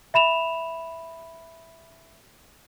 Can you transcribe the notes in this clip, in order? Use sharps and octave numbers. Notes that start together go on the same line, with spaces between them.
E5 B5 E7 F7